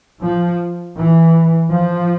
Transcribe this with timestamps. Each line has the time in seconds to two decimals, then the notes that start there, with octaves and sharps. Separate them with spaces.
0.22 F3
0.97 E3
1.72 F3